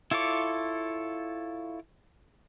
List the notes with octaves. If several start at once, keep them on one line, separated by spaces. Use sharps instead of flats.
E4 F4 A4 C#5 D6